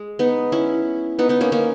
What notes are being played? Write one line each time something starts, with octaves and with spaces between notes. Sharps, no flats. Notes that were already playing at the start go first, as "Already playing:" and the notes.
Already playing: G#3
B3 D#4
C#4 E4
B3 D#4
B3 D#4
A#3 C#4
A#3 C#4